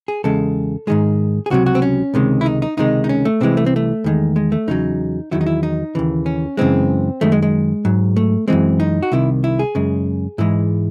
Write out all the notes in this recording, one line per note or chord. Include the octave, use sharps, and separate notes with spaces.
G#4
E2 C#3 G#3 A4
G#2 D#3 G#3 G#4
G#4
C#2 C3 F#3 F#4
F#4
C4
C#4
C#2 C3 D#3 G#3
E4
D#4
D#4
C#2 C3 D#3 G#3 D#4
D#4
C#4
A3
C2 C3 E3 G#3 C4
A3
C4
A3
E2 D#3 G#3
G#3
A3
E2 C#3 F#3 D#4
E2 D#3 F#3 E4
D#4
E4
D#4
D#2 C#3 E3
C#4
F#2 C#3 E3 G#3 C4
F#2 D#3 G#3 A3
G#3
G#3
G#2 F#3
A3
F#2 E3 G#3 C4
D#4
F#4
C2 C3 D#3 E4
E4
G#4
F#2 C#3 G#3
G#2 E3 G#3 E4